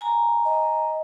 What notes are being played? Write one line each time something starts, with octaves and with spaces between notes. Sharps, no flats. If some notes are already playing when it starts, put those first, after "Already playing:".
G#5 A#5
D#5